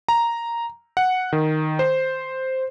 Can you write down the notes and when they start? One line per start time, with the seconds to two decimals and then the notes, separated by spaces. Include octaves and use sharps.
0.09 A#5
0.97 F#5
1.33 D#3
1.79 C5